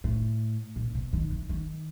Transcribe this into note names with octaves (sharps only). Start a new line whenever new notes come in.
A2
A#2
B2
D#3
E3
D#3